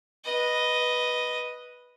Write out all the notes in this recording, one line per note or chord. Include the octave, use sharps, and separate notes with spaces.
B4 D#5